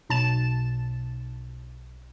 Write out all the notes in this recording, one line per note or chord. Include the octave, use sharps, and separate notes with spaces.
B1 A5 E7